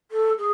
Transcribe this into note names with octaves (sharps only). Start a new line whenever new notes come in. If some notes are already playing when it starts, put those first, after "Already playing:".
A4
G#4